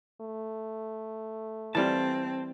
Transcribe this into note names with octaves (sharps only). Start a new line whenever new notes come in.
A3
E3 G3 C4 F4 A5